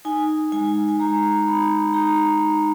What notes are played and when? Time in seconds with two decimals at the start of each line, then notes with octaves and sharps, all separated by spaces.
0.05 D#4 G#5
0.52 G#3 G#5
0.89 G#5
0.99 G#3 A#5
1.47 D#4 B5
1.94 D#4 A#5